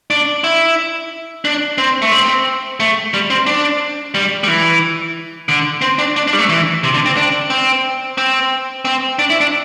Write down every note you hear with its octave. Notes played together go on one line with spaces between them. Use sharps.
D4
E4
D4
C4
A3
C4
A3
G3
C4
D4
G3
G3
E3
D3
C4
D4
D4
D4
G3
A3
E3
C3
D3
C4
D4
C4
C4
C4
D4
E4
D4